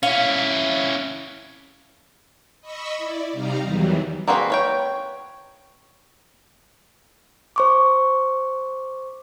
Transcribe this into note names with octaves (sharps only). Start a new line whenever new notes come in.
C#4 E4 F5
D#5 B5 C#6 E6
E4 D5
C3 G3 D#4 F5 A#5
E2 D#3 E3 F#3 G3
A#3 C4 F#4 G#4 B4
B4 C#5 G5
C5 C#6 D6